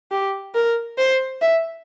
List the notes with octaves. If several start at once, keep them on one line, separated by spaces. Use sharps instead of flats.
G4
A#4
C5
E5